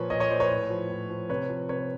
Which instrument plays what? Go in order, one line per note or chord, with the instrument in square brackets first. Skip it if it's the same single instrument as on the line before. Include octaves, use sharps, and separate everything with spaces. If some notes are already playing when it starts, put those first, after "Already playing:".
Already playing: [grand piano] A#2 F3 B4 C#5
A#2 C#5 D#5
C#5 D#5
F3 C5 D5
B4 C#5
A2
F3
A2
F3
C3 B4 C#5
F3
C3 B4 C#5